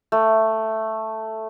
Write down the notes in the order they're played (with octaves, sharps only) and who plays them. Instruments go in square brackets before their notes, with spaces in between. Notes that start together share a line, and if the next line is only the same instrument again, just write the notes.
[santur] A3